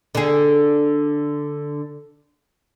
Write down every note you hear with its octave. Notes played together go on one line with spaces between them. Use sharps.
D3 G#4